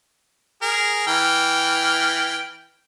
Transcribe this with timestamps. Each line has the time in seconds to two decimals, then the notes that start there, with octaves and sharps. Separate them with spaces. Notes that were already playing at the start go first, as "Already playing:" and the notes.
0.62 G#4 A#4
1.07 E3 G5 F6